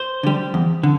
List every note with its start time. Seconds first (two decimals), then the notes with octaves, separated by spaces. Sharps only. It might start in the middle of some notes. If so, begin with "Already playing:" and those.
Already playing: C5
0.23 D3 G3
0.54 E2
0.83 D3